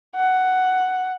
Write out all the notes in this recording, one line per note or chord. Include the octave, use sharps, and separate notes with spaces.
F#5